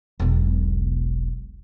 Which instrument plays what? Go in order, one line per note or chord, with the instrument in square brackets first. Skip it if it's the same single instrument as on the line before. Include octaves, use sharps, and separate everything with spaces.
[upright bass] E1 B1